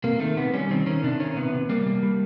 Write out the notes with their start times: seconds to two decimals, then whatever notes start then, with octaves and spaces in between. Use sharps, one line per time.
0.04 C3 A#3
0.20 D#3 A3
0.37 C3 B3
0.54 G3 C#4
0.70 D#3 C4
0.86 D#3 C#4
1.03 C3 D4
1.20 D#3 C#4
1.37 C3 B3
1.54 C3
1.69 G3 A#3
1.86 G3
2.03 G3